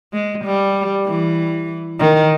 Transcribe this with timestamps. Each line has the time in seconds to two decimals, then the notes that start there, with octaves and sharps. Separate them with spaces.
0.13 G#3
0.45 G3
1.06 E3
1.99 D#3